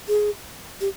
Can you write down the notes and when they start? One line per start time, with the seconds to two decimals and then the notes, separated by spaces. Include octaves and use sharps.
0.08 G#4
0.81 G4